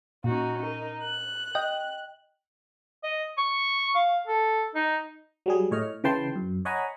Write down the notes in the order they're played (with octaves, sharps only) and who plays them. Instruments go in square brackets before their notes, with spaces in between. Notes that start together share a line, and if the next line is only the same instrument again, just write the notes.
[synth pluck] A#2 [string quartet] C#4 D#4 F#4
[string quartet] D#4 A#4
F#6
[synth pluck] D#5 G5
[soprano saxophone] D#5
C#6
F5
A4
D#4
[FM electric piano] F#3 G3 G#4
A2 C#5 D#5 F6
C#3 E3 B4 G5 A5 C6
F#2
C#5 D#5 F#5 G#5 A#5 B5